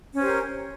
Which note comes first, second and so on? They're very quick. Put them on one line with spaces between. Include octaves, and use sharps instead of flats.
C#4 C5 G4 A#4